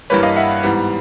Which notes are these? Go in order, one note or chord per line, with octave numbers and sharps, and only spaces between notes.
G2 E3 G3 A#3 B4 C#5
D#5 F5
E5 F#5
G#2 E3 G3 B3